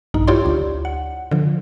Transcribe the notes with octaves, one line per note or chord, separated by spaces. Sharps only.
A#1 G2 D#4
E4 F4 G4 C#5 D5 C6
D2
F#5
D3 F3